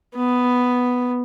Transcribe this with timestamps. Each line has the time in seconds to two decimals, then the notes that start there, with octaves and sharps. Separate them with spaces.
0.16 B3